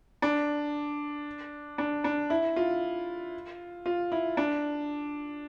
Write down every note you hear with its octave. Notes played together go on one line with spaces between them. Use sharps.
D4
D4
D4
E4
F4
F4
E4
D4